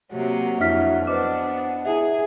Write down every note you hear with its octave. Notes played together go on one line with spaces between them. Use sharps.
C3 F#3 A#3
F2 D4 E4 E5 F6 B6
B3 D4 B4 C5 D#5 D6
E4 G#4 E5